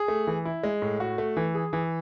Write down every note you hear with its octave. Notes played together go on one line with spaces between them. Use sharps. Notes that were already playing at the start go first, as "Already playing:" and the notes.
Already playing: G#4
A3
E3
E4
G#3
A2
F#4
A3
E3
G#4
E3